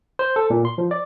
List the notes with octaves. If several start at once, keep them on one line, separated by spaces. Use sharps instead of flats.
C5
A4
A#2
C6
F3
D5